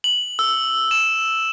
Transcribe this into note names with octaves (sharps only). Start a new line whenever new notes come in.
F#7
E6
E7